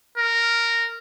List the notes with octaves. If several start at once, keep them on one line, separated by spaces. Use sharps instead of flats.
A#4